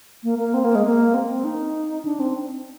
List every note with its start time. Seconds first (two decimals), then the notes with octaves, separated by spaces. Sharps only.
0.24 A#3
0.39 A#3
0.54 C4
0.64 A#3
0.75 G#3
0.86 A#3
1.14 C4
1.30 C4
1.44 D#4
2.05 D4
2.20 C4